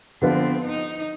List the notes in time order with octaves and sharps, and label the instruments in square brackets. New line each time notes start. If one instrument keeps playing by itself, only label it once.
[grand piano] D3 F3 B3 F4 B4 [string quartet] C4
[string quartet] D#4